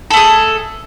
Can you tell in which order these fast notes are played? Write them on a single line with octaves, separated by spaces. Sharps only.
A4 A3 G#4